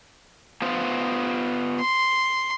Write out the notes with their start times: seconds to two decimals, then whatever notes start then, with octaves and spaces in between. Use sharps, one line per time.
0.62 B3 F4 C5
1.80 C6